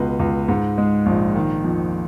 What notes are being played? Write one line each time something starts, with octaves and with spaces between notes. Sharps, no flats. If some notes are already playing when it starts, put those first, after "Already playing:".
Already playing: C#2 B2 B4 D#5
C#2
G#2
G#3
A#1
D#3
F2